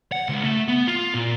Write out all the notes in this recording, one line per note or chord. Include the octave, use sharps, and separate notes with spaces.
F#5
C#2
A3
B3
F4
A#2